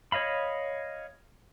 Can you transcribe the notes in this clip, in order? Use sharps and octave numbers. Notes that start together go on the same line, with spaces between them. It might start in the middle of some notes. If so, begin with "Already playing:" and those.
C#5 D#5 F5 B5